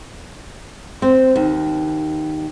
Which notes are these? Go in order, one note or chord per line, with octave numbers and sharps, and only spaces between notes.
C4
D#2